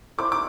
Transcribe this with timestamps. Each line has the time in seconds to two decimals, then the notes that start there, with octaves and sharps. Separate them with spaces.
0.18 C4 E4 A4 D5 D6
0.32 D6